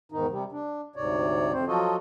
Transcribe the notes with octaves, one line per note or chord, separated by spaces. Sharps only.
E2 G#2 D#3 D#4
C3 G3
D4
D2 G#2 C3 C#5 D5
F2 C4 C5
F3 F#3 F4 F#4 A4 D#5